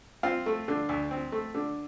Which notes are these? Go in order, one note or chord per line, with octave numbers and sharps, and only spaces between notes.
C4 F4
A3
D3
D2
C4
A3
D3